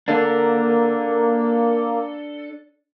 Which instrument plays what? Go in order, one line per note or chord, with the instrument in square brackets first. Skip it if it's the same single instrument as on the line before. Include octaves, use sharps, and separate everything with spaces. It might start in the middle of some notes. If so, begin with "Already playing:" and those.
[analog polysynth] A#3 [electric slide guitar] D4 A4